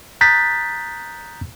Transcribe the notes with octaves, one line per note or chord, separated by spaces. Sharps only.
A#5 D#6 F#6 G6 A6 B6